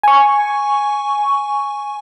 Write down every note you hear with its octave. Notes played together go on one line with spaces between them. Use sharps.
G#5 C#6